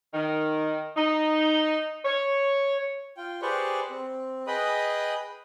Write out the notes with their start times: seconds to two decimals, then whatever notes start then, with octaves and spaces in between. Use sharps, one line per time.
0.14 D#3
0.97 D#4
2.05 C#5
3.16 F4 G5
3.42 G4 G#4 B4 C5 D5 C#6
3.91 C4
4.47 G#4 B4 D#5 G5 B5 D#6